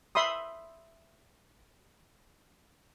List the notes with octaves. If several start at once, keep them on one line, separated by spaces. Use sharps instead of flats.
E5 B5 C6 D#6